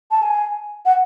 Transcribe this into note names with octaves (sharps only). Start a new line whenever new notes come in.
A5
G#5
F#5